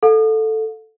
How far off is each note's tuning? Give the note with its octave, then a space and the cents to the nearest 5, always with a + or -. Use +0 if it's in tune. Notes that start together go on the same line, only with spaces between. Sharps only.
A4 +0 F5 +45